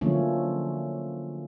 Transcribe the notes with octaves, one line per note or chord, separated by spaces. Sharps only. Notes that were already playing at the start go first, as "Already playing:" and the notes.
D3 F3 F#3 A3 A#3 C#4